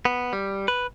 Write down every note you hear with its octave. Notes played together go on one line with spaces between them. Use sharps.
B3
G3
B4